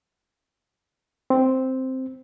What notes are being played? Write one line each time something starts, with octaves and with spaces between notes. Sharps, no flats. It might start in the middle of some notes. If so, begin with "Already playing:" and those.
C4